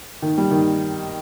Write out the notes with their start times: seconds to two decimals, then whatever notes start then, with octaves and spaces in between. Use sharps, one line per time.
0.22 D#3
0.38 G3
0.51 D#3